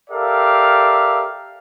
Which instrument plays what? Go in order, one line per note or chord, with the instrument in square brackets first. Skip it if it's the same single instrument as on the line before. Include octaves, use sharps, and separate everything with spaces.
[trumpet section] G4 A4 A#4 D5 E5 F5